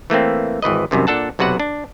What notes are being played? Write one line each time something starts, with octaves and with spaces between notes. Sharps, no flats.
E3 A3 A#3 C4
G#1 E3 B4 D#5
C2 F#2 C3 D#3
A#2 D4 A4 F#5 A5
B1 C3 F#4 B4 F#5
D4